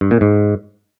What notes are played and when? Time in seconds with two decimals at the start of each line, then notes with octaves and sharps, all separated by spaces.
0.01 G2
0.11 A#2
0.21 G#2